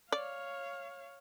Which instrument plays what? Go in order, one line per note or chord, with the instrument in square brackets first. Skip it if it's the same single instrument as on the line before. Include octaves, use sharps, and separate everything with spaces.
[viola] C#5 F5 [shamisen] D5